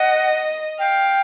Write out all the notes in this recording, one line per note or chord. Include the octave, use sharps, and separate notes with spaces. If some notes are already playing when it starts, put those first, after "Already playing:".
Already playing: D#5 F#5
F5 G5